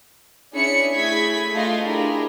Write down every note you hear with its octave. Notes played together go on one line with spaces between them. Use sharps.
C#4 D4 E4 G#4 E5 C#7
A3 E4 G#4 B5 G#6 B6
A3 D4 F4 D#5 F5 C6
D4 E4 G4 G#4 A#4